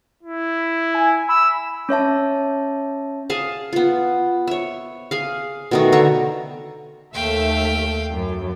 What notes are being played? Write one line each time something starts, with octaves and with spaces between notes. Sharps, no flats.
E4
G#5
B5 E6
C#4 C#5 E5 A5
G#4 F5 A5
B3 F4
C#5 E5
G#4 F5
B2 D#3 A3
D3 E5 A#5 C#6
D#2 A3 E5 F5 G5
F#2